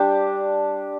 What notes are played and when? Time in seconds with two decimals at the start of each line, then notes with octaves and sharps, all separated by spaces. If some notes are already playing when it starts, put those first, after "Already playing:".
Already playing: G3 D4 G4 C5